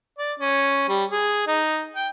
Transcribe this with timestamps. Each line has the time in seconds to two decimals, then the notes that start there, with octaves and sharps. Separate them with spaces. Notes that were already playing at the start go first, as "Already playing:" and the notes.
0.18 D5
0.40 C#4
0.89 G3
1.11 G#4
1.47 D#4
1.96 G5